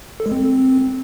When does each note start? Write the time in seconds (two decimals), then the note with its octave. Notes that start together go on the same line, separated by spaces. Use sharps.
0.20 A4
0.26 G#3
0.32 C4